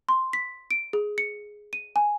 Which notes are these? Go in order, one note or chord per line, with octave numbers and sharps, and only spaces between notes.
C6
B6
D7
G#4
C#7
D#7
G#5